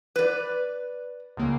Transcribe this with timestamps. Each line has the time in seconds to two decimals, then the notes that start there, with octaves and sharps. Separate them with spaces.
0.16 B4 D5
1.37 C#2 C#3 A#3